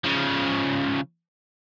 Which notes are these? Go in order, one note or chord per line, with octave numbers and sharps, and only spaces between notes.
C#3 F3